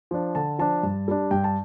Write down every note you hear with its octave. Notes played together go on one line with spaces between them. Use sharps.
F3 D4
D3 A5
F3 D4 A5
G2
G3 D4
G2 G5
A5